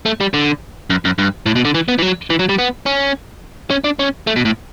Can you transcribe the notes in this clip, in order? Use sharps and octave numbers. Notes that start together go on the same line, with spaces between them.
A3
G3
D3
F#2
F#2
G2
A2
B2
D3
E3
B3
E3
F#3
E3
F#3
G3
B3
C#4
C#4
D4
C#4
A3
B2
A2